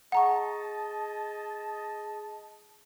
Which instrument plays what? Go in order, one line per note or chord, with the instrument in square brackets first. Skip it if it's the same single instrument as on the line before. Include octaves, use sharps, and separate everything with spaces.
[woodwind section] G#4 D#5 A5 [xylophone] F#5 A#5 C#6